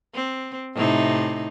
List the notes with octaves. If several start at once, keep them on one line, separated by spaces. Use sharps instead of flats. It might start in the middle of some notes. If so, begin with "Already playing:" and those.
C4
A2 C3 D#4